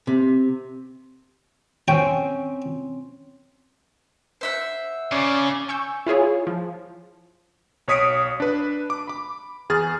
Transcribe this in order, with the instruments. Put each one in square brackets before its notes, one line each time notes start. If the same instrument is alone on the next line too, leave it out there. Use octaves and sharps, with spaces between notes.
[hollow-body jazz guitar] C3
[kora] C4 C#4 [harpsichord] G5
[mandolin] C5 E5 F#5
[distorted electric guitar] C#3 [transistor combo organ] C#4 [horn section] D5
[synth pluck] G#5 C#6 E6 G6
E4 F4 G#4 C#5
F3
[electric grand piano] B1 C#5 D#6 B6 C#7 D7
D4 B4
D6
B5 D6
E2 G#4 F6 A6